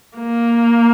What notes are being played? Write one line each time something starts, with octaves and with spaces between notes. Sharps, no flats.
A#3